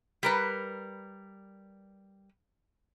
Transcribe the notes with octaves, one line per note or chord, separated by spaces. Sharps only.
G3 A#4 B4